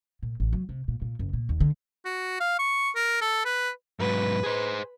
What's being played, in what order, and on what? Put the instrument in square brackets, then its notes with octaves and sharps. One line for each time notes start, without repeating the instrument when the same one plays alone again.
[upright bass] A#2
A1
F#3
C3
A#2
A#2
F#1
A#2
D#2
D3
[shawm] F#4
F5
C#6
A#4
A4
B4
[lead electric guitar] G#2 F#3 [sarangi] B4
[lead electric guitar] G#4 C5